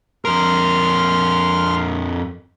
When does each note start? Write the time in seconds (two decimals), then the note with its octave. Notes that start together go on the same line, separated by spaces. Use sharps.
0.25 F2 A#4 C6 F6